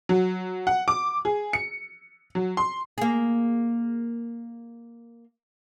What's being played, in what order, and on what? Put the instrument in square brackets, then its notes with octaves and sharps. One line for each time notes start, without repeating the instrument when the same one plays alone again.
[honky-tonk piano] F#3
F#5
D6
G#4
C#7
F#3
C6
[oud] A#3 G#4